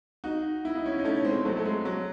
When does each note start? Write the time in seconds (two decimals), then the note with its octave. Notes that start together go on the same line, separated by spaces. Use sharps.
0.24 D#4 F#4
0.65 E4
0.75 D#4
0.86 C#4 E4
0.99 D#4
1.04 A3 C#4
1.25 G#3 C4
1.37 C4
1.45 F#3 A3
1.57 A3
1.65 G#3
1.85 F#3